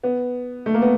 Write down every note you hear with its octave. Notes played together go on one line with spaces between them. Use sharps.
B3
A3
A#3
B3